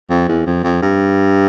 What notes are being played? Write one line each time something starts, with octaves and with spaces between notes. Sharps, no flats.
F2
E2
F2
F2
G2